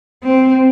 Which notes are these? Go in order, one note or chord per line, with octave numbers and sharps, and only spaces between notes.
C4